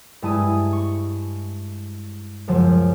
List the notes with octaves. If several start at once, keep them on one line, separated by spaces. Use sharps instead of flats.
G2 G#3 E4 A5 D#6 D#7
C#6
C#2 F#2 F3